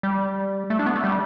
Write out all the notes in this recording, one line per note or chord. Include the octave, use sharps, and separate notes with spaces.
G3
A3
D4
B3
A3
G3